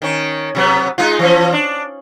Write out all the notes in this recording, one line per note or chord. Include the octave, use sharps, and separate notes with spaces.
D#3 C#4
C3 F#3 B3
G#3 D#4 F4
E3 F3 C#4
D4